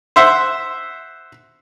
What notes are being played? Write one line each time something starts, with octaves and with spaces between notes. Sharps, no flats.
C5 E5 F#5